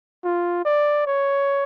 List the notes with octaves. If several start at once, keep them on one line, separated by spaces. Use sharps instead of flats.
F4
D5
C#5